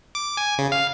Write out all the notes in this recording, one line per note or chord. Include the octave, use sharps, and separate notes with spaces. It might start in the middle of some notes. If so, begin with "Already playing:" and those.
D6
G#5
C#3
F5